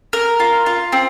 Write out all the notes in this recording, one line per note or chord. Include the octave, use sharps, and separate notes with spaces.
A#4
F4
F4
C4